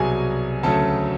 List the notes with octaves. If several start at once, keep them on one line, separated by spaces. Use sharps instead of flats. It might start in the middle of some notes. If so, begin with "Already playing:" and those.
Already playing: C2 B2 F#3 G#4 G#5
D2 C#3 F#3 A3 A4 A5